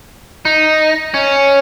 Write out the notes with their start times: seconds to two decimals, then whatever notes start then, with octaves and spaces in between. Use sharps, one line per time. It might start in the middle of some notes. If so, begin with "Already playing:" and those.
0.45 D#4
1.14 C#4